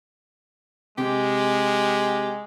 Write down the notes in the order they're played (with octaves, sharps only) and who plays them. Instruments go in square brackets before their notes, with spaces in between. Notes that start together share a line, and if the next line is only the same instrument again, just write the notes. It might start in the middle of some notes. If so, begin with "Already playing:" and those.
[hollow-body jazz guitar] C3 [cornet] G#3 [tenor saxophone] G4